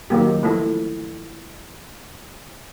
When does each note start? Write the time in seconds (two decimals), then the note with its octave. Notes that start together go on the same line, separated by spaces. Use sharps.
0.10 D#3 F#3 A#3 G4
0.43 F3 A3 E4